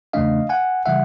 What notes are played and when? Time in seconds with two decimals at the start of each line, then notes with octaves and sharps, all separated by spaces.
0.13 E2 C#3 E3 A3 D4 D#5 F5
0.49 F#5 G#5
0.86 C#3 E3 G3 E5 F#5